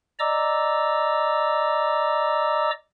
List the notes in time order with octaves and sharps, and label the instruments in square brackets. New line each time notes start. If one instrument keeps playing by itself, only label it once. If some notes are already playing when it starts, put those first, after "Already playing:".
[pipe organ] D5 D#5 A#5 D6 E6